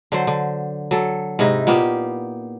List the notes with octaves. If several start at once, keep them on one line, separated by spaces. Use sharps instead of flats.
D3 F#3 C5
D3
F#3 A4
G#2 C3 D#4 E4
A#2 A#3 B3 G4